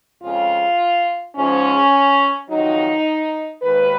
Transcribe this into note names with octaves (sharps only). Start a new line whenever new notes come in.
F2 C#3 G#3 F4
G#2 F3 G#3 C#4
F2 D#3 F#3 D#4
D#2 D#3 G#3 B4